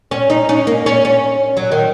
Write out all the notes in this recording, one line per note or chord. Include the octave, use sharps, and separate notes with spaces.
C#4
D#4
C#4
A#3
C#4
C#4
F#3
D#3